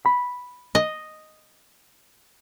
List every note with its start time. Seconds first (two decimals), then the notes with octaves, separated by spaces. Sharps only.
0.06 B5
0.75 D#5